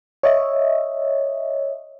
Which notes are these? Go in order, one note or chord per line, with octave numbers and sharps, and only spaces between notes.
C#5 D#5 E5